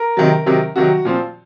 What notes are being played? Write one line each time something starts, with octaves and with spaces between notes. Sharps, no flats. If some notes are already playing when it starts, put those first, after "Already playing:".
Already playing: A#4
C3 D#3 F#3
C3 D#3 F#3
C3 D#3 F#3 F#4
A#2 F3 C4 F4